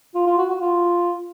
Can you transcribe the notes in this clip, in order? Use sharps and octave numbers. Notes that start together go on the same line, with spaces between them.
F4
F4
F#4
F#4
F4